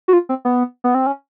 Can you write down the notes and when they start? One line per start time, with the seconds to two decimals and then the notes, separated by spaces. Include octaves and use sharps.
0.08 F#4
0.13 F4
0.29 C4
0.45 B3
0.84 B3
0.95 C4
1.06 C#4